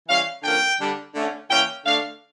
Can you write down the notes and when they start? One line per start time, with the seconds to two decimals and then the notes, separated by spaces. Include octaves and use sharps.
0.09 E3 G3 C#4 F5
0.43 D3 F3 A#3 C#4 G5
0.80 D3 G3 D4
1.15 D3 A3 C#4
1.50 E3 A#3 C#4 G5
1.86 D3 A3 D4 F5